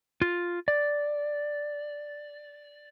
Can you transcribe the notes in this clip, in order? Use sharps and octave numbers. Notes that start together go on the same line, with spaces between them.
F4
D5